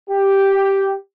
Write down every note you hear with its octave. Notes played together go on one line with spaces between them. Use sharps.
G4